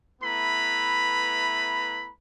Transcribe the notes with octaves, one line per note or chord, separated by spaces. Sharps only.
A3 B3 E4 B4 A#5 B5